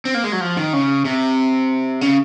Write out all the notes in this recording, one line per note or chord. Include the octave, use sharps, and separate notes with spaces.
C4
A#3
G#3
F#3
F3
D#3
C#3
C3
C#3